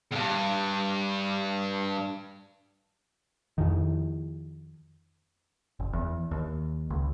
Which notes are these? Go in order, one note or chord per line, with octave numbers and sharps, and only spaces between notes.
E2 G2
F2 D#3
F#1
E2
D#2
C#2